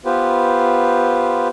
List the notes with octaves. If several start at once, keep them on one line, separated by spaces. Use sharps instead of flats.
B3 F4 G4 B4 C5